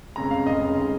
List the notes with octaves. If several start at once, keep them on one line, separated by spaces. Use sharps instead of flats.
F1 F2 C#3 G#3 A#5
F5
F1 F2 C#3 G#3 D#5
D#3 G#3